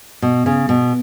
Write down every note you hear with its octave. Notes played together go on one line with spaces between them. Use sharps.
B2
C#3
B2